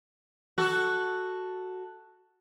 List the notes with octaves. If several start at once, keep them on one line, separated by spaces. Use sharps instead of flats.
F#4 A4